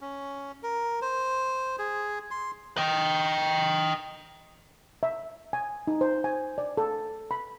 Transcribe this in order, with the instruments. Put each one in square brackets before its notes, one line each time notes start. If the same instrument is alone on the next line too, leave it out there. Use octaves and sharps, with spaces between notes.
[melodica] C#4
A#4
C5
G#4
C6
[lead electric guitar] D#5 G5
[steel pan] E5
G#5
D#4
C5
G#5
D5
A4
B5